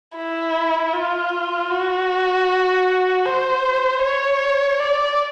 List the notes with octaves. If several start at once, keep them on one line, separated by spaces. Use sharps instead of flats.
E4
F4
F#4
C5
C#5
D5